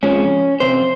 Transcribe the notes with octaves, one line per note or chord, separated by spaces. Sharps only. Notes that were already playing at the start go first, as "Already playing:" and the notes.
F2 C#3 F3 G#3 C#4
F2 C3 C5